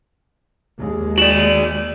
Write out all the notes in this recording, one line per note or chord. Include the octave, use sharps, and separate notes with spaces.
D#2 G#3
F#4 D5 E7 F#7